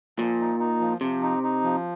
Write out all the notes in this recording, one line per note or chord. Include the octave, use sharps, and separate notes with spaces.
A#2 F3
D#4
D#4
F3
C3 F3
D#4
D#4
F3